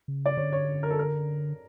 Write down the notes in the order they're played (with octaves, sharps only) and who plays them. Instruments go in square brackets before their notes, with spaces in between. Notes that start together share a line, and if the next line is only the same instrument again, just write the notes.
[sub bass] C#3
[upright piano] D5
[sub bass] D3 [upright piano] C#5
[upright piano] C#5
A#4
A4
A#4